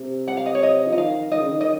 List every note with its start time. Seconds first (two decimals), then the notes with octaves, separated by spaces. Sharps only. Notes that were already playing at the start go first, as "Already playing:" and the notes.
Already playing: C3
0.28 F#5
0.37 F5
0.46 D#5
0.55 C#5
0.63 D#5
0.87 F3
0.92 D#5
0.98 D#3 F5
1.31 D#3 D#5
1.41 C#3
1.50 D#3
1.61 D#5